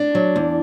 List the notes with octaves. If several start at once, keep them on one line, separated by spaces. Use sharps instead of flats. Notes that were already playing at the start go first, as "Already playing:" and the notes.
Already playing: D4
F#3
E2